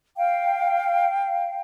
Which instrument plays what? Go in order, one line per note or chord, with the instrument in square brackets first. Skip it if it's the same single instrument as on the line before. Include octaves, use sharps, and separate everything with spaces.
[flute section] F5 G5